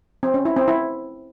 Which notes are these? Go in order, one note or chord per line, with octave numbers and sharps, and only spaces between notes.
C4
C#4
E4
C4
E4